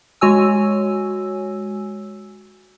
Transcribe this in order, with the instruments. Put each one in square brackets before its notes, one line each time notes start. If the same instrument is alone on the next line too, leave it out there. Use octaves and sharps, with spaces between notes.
[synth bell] G#3 F#4 C#5 G#5 E6